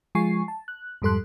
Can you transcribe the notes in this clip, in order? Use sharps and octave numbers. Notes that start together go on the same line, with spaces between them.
F3 G#3 F4 G#5 C#6 C7
A5
F#6
F2 G#2 G3 A4 C6 F#6